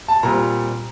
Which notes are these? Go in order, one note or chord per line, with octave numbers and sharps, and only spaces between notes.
A5
A#2 G3 C4 A#5